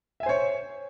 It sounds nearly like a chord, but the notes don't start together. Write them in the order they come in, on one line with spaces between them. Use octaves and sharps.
E5 G#5 C5 C#5